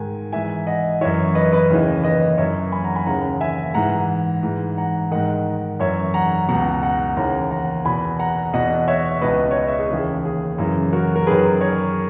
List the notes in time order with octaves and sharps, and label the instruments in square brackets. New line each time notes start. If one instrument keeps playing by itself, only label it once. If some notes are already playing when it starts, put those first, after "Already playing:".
Already playing: [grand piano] G#2 D#3 G#5
G#2 E3 E5 G#5
D#5 F#5
F#2 E3 C#5 E5
B4 D#5
B4 D#5
D#2 C#3 E3
B4 D#5
F#2 E3 C#5 E5
G#5 B5
F#5 A#5
G#5 B5
D#2 C#3 E3 F#5 A#5
E5 G#5
G#2 E3 F#5 A#5
G#2 E3
F#5 A#5
G#2 D#3 D#5 F#5
F#2 E3 C#5 E5
F#5 A#5
C#2 B2 F#5 A#5
F#5 A#5
D#2 C#3 E3 F#5 A#5
F#5 A#5
E2 B2 G#5 B5
F#5 A#5
E2 B2 D#5 F#5
C#5 E5
C#2 B2 B4 D#5
C#5
B4 D#5
C#5 E5
G#4
D#2 C#3 E3 G#4
G#4
F#2 C#3 E3
F#4 A#4
A#4
F#2 D#3 G#4 B4
A#4 C#5